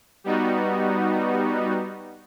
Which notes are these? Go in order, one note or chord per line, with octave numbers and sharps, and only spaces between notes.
G3 B3 D#4 F#4